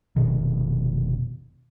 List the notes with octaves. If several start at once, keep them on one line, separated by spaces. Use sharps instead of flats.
F1 C#2 B2 D#3